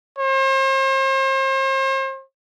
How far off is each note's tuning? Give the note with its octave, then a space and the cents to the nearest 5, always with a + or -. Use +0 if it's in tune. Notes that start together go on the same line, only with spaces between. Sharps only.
C5 +40